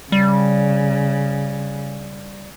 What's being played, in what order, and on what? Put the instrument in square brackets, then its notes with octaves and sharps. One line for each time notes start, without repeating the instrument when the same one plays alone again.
[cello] C#3 [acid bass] G3